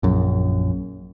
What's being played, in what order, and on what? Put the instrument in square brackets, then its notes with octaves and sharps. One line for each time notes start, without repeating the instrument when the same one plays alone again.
[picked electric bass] A#1 F#2